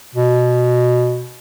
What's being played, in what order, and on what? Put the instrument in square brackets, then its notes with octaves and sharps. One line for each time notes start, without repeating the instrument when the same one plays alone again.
[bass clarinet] B2